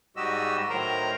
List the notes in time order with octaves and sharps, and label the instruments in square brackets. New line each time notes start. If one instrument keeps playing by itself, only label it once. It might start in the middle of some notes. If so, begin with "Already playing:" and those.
[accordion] G#2 G3 F#4 G4 D#5 E6
A2 D#3 F#3 A#4 C5 A#5